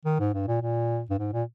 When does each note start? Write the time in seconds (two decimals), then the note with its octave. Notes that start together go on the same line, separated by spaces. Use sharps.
0.05 D#3
0.20 G#2
0.34 G2
0.47 A#2
0.62 A#2
1.10 G2
1.19 G#2
1.33 A#2